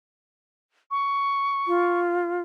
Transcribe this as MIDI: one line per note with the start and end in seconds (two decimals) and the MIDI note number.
0.91 2.00 85
1.68 2.41 65